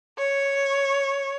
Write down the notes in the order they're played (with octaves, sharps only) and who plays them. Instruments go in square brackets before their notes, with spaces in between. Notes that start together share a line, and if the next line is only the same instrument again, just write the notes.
[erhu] C#5